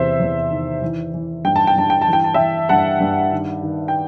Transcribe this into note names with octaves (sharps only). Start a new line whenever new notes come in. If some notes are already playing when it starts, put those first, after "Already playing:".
Already playing: E2 C3 C5 E5
E2
D#3
E3
E3
G2 G5
A5
G5
G2 A5
G5
A5
E3
G5
A5
E3 E5 G5
G2 F#5 A5
G2
D#3
D#3
G5